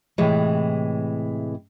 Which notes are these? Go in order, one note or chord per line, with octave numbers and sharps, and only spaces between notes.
A2 C3 E3 G#3